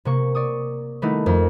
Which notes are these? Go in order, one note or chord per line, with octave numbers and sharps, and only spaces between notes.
C3 A#3 C#6
D5 C#6 D#6
D#3 G3 A3 B3 D#4 E4
F2 A#4 F6